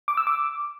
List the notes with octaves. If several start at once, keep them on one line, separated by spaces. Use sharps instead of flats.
D6
E6
D6